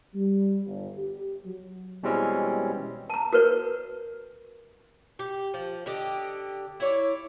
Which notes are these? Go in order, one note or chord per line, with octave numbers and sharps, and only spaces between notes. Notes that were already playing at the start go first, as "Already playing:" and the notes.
G3
G1
G4
F#3
B2 E3 G3 G#3 C4 C#4
A5 A#5
F#4 A#4 B4 C#5
G4
F3
D3 G4 D#5
E4 C#5 D5